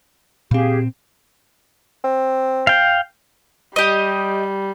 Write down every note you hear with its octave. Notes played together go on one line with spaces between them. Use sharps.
A#2 C4 G4 G#4 F5
C4
F5 G5
G3 G4 D#5